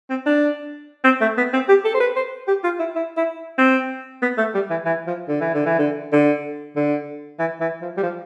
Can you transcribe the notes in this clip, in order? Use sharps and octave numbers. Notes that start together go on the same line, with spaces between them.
C4
D4
C4
A3
B3
C4
G4
A4
C5
B4
C5
G4
F4
E4
E4
E4
C4
B3
A3
G3
E3
E3
F3
D3
E3
D3
E3
D3
D3
D3
E3
E3
F3
G3
F3